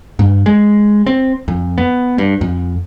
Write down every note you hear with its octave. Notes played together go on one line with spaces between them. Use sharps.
G2
G#3
C4
F2
B3
G2
F2